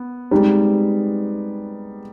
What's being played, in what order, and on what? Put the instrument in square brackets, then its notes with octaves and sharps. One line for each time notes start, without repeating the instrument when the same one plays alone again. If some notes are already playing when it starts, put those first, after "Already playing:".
Already playing: [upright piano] B3
[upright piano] G3 [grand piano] G#3 C4 D#4 G4